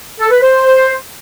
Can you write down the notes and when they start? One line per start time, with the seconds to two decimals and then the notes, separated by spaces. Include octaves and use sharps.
0.19 A4
0.31 B4
0.43 C5